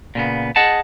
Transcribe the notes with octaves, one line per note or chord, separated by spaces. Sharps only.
A#2 C#3 B3
G#4 D#5 F#5 A5